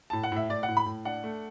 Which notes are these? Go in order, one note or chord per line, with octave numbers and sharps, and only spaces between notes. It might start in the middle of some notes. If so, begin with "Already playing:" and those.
A2 A5
F#5
A2 E5
A2 D5
F#5
A2
B5
A2
D4 F#5
A3